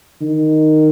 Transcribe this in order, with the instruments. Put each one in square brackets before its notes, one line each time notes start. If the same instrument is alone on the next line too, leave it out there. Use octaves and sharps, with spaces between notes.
[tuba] D#3